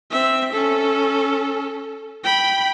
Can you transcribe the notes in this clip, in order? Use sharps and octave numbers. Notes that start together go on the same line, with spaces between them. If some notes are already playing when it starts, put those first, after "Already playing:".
C4 E5
C#4 A4
G5 B5